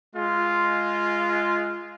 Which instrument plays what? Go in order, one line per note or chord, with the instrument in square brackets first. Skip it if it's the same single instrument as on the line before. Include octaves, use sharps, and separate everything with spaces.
[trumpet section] G#3 F4